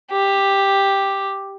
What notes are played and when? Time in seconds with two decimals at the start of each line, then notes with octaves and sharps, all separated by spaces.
0.12 G4